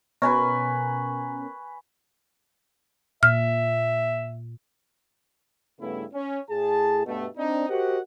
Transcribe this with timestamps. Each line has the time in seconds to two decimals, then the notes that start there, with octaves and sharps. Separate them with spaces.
0.22 B2 C#4 A#4 B4 G#5 C#6
3.23 A#2 E5 F6
5.80 G2 C#3 A3 B3 E4
6.13 C#4
6.50 A2 G#4 A5
7.06 G2 B2 A3
7.37 C4 D4 D#4
7.70 F#4 G4 A#4 C5 D#5 F#5